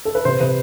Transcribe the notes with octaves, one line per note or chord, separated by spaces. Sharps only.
A4
B4
C3 C5
C3 B4